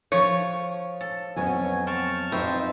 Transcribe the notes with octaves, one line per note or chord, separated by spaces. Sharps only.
F3 C#5
A4
F2 F#3 B3 C#4 G#5
C4 A5 C#6 F6
F2 D#4 B4 C5 E5 G5